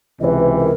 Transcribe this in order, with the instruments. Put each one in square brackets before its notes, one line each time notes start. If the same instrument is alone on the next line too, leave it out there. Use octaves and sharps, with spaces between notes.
[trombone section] C#2 C3 E3 [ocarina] B4 D#5
[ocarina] B4
A#4